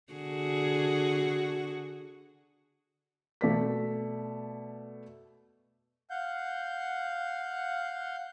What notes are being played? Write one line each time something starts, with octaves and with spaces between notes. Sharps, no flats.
D3 F#4 G#4
B2 A3 D5 B6
F5 F#5 G6